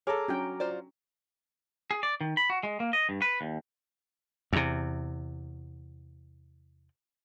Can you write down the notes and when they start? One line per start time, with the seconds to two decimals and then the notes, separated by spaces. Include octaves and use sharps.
0.07 G#4 A4 C#5 A#5 D6 F6
0.28 F#3 C#4 D4 G5
0.60 F4 C5 D5
1.91 G#4
2.03 D5
2.21 D#3
2.37 B5
2.50 F#4
2.63 G#3
2.80 A#3
2.93 D#5
3.09 G2
3.22 B4
3.41 D#2
4.53 E2 C3